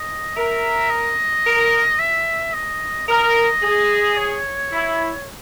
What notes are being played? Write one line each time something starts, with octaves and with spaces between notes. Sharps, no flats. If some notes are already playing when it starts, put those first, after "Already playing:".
Already playing: D#5
A#4 E5
D#5
A#4
E5
D#5
A#4 D#5
G#4
C#5
E4